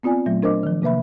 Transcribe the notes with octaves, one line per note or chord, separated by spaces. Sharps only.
B3 C4 F4 D5 G#5
A#2 F#3 A3
D4 A#4 C5 D#5 D6
D#3 F3
C3 A#3 B4 E5 B5